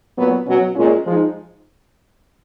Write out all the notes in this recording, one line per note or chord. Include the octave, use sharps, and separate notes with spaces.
A#2 F#3 B3
B2 F#3 C#4 F#4
A#2 G#3 C#4 F4
F3 G#3 D#4